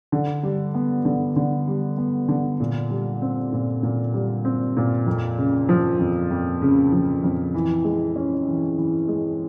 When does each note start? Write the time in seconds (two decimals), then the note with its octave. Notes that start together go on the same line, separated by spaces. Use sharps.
0.12 D3
0.43 G3
0.74 B3
1.05 D3
1.36 D3
1.67 G3
1.97 B3
2.29 D3
2.60 A#2
2.90 G3
3.22 C4
3.53 A#2
3.83 A#2
4.14 G3
4.45 C4
4.77 A#2
5.06 F2
5.38 C#3
5.69 F3
5.99 F2
6.30 F2
6.62 C#3
6.92 F3
7.24 F2
7.54 E3
7.84 G#3
8.16 C#4
8.47 E3
8.78 E3
9.08 G#3